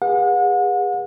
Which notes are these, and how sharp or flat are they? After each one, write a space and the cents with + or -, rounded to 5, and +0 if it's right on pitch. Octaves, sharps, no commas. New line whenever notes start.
G#4 -40 B4 -35 F#5 -40